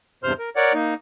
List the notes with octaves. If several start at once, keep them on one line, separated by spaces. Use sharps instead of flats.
E2 G2 C3 C5 C6 F6
A#4
A#4 C#5 D5 F#5
A#3 D#4